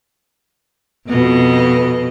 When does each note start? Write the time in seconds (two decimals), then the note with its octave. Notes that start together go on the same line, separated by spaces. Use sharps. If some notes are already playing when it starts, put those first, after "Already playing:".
1.09 F2 B2 D#5